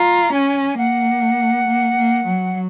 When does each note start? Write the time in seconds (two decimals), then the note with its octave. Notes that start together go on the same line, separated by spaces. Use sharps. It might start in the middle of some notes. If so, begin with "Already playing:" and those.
Already playing: F4 A#5
0.34 C#4 G#5
0.78 A#3 F#5
1.67 A#3
1.97 A#3
2.26 F#3